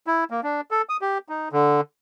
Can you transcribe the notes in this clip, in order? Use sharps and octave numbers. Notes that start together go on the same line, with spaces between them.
E4
A#3
D4
A4
D#6
G4
D#4
D3